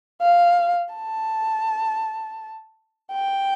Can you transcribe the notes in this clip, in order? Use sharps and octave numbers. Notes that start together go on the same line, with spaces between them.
F5
A5
G5